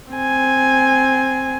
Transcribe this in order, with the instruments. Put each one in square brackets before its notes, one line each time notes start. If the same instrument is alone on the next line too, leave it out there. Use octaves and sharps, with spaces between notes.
[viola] C4 G#5